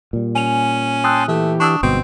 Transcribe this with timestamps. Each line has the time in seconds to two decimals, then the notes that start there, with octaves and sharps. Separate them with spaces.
0.13 A#2 G3
0.35 C#4 G#5 D#7 F7
1.04 G5 A5 C6 D#6 E6 F#6
1.28 E3 A3 G4
1.60 D4 C#6 D#6 E6
1.83 G1 G#2 B2 C4